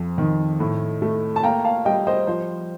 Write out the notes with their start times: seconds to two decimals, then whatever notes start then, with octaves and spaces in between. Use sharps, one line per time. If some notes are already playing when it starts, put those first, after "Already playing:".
Already playing: F2 F3
0.18 D#3
0.60 A2
1.02 A3
1.36 A5
1.43 A#3 G5 A#5
1.64 F5 A5
1.85 G3 D#5 G5
2.07 C5 D#5
2.27 F3 C5